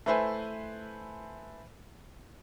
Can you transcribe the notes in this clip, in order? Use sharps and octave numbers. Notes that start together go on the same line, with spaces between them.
A3 E4 B4 C5 E5 G#5